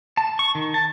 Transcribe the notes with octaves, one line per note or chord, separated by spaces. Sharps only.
A5
C#6
D#3
A5